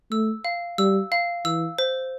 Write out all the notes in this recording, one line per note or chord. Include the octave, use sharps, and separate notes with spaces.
A3 E6
F5
G3 E6
F5
E3 E6
C5